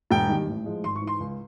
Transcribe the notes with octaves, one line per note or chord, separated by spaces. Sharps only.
E1 G5
D#2 D#3 G3
A1
A2 F3 G#3
G#1 C6
C#6
G#2 E3
C6
C#2